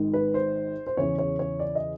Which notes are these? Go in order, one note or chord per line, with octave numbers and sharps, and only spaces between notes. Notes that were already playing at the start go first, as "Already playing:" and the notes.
Already playing: G#1 G#2 D#3
B4
C5
C5
E2 C#3 E3 C#5
C#5
C#5
D5
D#5